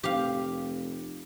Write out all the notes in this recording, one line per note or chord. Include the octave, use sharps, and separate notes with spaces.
F1 G4 F5